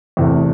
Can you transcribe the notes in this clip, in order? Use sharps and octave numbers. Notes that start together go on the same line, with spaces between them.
E2 C3 E3 A3